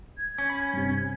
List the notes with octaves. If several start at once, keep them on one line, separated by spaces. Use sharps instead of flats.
G#6
C#4
B5
G2 C3